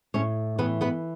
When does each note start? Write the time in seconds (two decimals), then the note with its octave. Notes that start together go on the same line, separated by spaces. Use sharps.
0.14 A2 C#4 C#5
0.59 E3 B3 B4
0.81 B3 B4